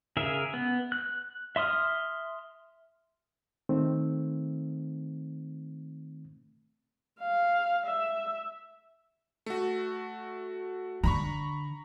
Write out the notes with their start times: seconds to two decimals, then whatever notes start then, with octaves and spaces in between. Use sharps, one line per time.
0.17 C#3 G#4 A#4 E5
0.54 B3
0.92 F#6
1.56 E5 C6 D#6 F6
3.69 D#3 A3 C4
7.20 F5
7.86 E5
9.46 A3 F#4
11.04 D3 A#5 B5 C#6